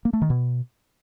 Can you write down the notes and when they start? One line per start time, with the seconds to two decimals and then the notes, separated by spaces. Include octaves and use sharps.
0.05 A#3
0.13 A3
0.22 D#3
0.30 B2